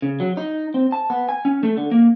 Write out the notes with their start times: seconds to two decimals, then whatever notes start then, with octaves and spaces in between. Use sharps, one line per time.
0.02 C#3
0.20 F#3
0.37 D#4
0.74 C4
0.92 A5
1.10 B3
1.29 G#5
1.45 C#4
1.63 A3
1.77 D3
1.91 A#3